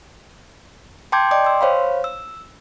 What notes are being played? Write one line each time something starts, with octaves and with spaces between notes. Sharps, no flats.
G5 A5 C6 D6 G6 G#6
D5 D#5 G5 D6
C6 E6
C5 C#5 F5 B5
E6